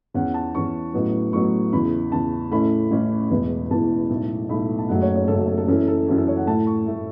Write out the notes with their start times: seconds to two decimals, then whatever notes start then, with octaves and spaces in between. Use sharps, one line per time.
0.14 E2 E3 C#4 F#5
0.34 A5
0.54 E2 E3 C#4 C#6
0.94 A1 A2 F#3 B3
1.33 A1 A2 F#3 B3 C#6
1.73 E2 C#3 E3 B5
2.12 E2 C#3 E3 A5
2.52 A1 A2 A3 C#4 E4 B5
2.91 A1 A2 A3 C#4 E4
3.30 E1 E2 E3 B3 E4
3.71 E1 E2 E3 B3 E4 A5
4.10 B1 A2 A3
4.49 B1 A2 A3 B5
4.78 A5
4.89 F#1 F#2 C#3 F#3 A3 F#5
5.02 C#5
5.16 C#5
5.28 F#1 F#2 C#3 F#3 A3 A4
5.38 F#4
5.47 A4
5.58 A4
5.68 F#2 E3 C#4 E4 A4
5.88 A4
6.07 F#2 E3 C#4 E4 F#4
6.17 A4
6.27 C#5
6.37 F#5
6.47 A2 A3 E4 A5
6.67 C#6
6.86 A2 A3 E4